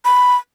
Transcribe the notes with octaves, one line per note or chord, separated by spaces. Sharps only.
B5